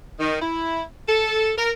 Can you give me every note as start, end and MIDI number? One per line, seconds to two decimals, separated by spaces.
0.20 0.39 51
0.41 0.82 64
1.08 1.51 69
1.57 1.71 70